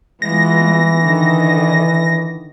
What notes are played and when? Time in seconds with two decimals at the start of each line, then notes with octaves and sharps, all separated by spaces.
0.22 E3 G#3 B3 F4 A#6
1.01 D3 D#3 D#5